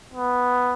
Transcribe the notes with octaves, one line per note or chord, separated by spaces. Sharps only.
B3